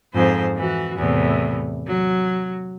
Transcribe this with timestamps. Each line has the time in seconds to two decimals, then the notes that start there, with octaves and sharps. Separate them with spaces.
0.14 F2 G#2 C5
0.56 E3 F#4
0.97 E2 A2 C3
1.86 F#3